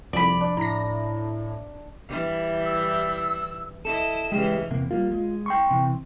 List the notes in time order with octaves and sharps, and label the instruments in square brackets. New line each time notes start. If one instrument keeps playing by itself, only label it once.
[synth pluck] C2 F2 F3 [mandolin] D5 B5
[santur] D4
[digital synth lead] A2 [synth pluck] A#5 A#6
[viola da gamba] E3 G3 E4
[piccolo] E6
[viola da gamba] E4 D#5 [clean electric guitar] A4 [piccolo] E7
[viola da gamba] C#3 E3 [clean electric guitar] G#3 G4
[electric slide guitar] E2 C3 A#3
[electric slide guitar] G3 A#3 [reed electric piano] F4
[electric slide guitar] G#3
[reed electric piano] G5 C6 C#6
[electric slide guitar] C3 E3